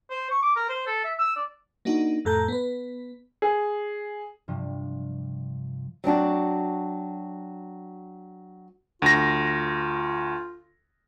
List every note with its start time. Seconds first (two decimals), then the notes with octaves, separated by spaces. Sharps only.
0.10 C5
0.31 C#6
0.43 D6
0.56 A#4
0.69 C5
0.87 A4
1.04 E5
1.19 E6
1.36 D5
1.85 A#3 D4 D#4 F#4
2.25 F2 A2 A4 A#5 G6
2.48 B3 B4
3.42 G#4
4.48 G2 C3 F3
6.04 F#3 C4 D4 F#4
9.02 D2 F4 A#6